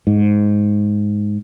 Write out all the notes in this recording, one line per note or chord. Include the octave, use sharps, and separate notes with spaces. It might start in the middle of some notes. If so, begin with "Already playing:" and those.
G#2